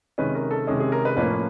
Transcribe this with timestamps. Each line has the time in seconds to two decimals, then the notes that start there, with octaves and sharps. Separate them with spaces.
0.18 C3 D#3 G#3 C#4 B4
0.35 A#4
0.51 A4
0.67 C3 D#3 G#3 C#4 G#4
0.80 G#4
0.92 A#4
1.05 B4
1.17 A2 F3 A#3 C#4 B4